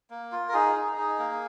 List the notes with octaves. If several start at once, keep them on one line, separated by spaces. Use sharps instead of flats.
A#3
F4
A#4
D#4 G#4
D#4
D#4
A#3